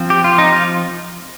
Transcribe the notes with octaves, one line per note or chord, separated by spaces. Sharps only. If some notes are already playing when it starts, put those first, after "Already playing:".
Already playing: F3 C4
G4
F4
D#4
F4